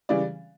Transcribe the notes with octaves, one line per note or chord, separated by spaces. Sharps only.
C#3 E3 G3 D5